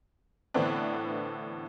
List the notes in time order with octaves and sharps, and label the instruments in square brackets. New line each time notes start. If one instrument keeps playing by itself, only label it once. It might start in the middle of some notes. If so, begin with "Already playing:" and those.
[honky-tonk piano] A2 D3 E3 B3 C4 D4